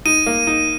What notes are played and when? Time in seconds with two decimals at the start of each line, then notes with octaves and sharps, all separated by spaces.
0.05 D#4 D#7
0.26 A#3
0.47 D#4